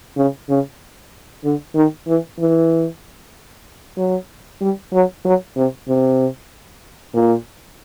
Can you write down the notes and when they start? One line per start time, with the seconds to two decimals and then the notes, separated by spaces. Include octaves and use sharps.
0.17 C#3
0.49 C#3
1.44 D3
1.75 D#3
2.07 E3
2.39 E3
3.97 F#3
4.61 G3
4.93 F#3
5.25 F#3
5.56 C3
5.88 C3
7.14 A#2